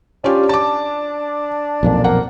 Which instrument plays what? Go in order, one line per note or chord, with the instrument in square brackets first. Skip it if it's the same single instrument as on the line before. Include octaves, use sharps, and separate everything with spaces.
[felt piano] C#4 F4 G4 [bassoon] D4
[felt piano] A5 D6
[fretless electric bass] B1 F2 A#2
[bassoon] A#3 [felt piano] F#5